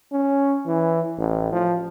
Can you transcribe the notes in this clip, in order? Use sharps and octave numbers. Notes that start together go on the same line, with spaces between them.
C#4
E3
A1
F3